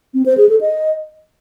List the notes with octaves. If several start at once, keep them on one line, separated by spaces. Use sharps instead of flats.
C4
C5
G#4
A4
D#5